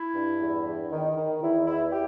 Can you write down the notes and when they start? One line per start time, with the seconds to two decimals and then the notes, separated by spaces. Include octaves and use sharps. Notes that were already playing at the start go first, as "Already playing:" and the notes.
Already playing: E4
0.15 G2
0.40 E2
0.66 E2
0.91 D#3
1.16 D#3
1.42 E2 E4
1.67 E2 E4
1.92 G4